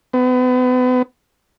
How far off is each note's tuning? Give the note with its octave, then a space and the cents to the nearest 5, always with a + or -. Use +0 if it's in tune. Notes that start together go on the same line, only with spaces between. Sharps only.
B3 +35